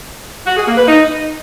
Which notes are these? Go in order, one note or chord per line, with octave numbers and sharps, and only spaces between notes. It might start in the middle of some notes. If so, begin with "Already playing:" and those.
F#4
G#4
A#3
B4
D#4